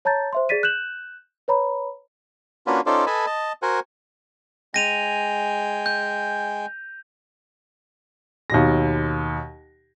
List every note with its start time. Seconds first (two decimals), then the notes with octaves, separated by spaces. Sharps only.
0.05 C#5 A5 A#5 G6 A6
0.33 C5 E5 C6
0.49 G#4 D5 A6 B6 D#7
0.63 F#6 G6 E7 F#7
1.48 B4 C#5 A#5 B5
2.67 A#3 C#4 D4 F4 F#4 B4
2.86 C#4 D#4 F4 A4 C5 D5
3.06 A4 B4 D#5 G#5 A5 B5
3.26 D#5 A5
3.62 F#4 A#4 C5 F#5 G#5
4.74 G#3 G5 G#5 A#6 D#7 F7
5.86 G6
8.50 D#2 B2 A#6